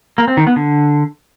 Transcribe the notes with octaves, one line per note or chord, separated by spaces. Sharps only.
A#3
C4
D#3
B3
D3